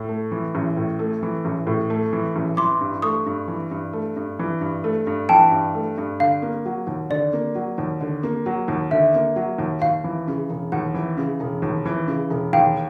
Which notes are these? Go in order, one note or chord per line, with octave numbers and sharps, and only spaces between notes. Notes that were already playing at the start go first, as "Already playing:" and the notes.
Already playing: A2
A3
E3
A1
A2
A3
E3
A1
A2
A3
E3
A1
E3 C6 D6
G2
A3 C#6 D#6
G2
E3
G2
A3
G2
E3
G2
A3
G2
E3 G5 A5
G2
A3
G2
D3 F5
A#3
F#3
D#2
D3 D5
A#3
F#3
D#2
D3
A#3
F#3
D#2
D3 E5
A#3
F#3
D#2
D#2 F5
E3
C#3
E1
D#2 F#5
E3
C#3
E1
D#2
E3
C#3
E1
D#2 F5 G5